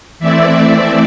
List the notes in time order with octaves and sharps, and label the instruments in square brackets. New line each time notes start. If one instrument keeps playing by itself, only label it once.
[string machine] E3 A3 C4 E4 D5 E5